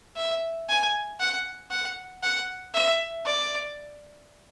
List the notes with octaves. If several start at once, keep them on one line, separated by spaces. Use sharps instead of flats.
E5
G#5
F#5
F#5
F#5
E5
D5